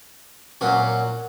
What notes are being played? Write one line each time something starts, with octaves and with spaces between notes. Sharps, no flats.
A#2 F#3 C#4 F#4